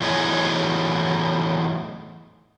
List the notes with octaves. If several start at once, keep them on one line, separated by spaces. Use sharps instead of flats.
E2 A2 F#3 D#4 G#4